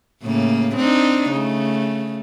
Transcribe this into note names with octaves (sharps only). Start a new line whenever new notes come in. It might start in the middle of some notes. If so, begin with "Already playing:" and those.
A2 C#3 A#3
C4 D4 D#4
C#3 A3